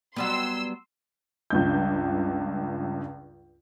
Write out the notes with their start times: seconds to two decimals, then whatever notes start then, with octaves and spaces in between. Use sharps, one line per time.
0.16 F#3 G3 B3 C6 E6
1.50 C#2 G2 G6